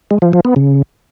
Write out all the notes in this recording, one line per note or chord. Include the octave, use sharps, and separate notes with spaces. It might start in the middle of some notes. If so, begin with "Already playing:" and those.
G#3
F3
F3
B3
C#3